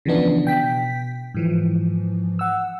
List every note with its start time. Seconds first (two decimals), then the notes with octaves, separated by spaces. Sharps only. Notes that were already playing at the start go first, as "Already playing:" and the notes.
0.05 C#3 E3 F3 B3 D4
0.45 B2 G5 B6
1.34 G#2 E3 F3
2.39 F#5 E6